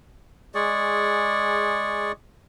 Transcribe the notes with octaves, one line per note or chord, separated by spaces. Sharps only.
G#3 G#4 D5 C#6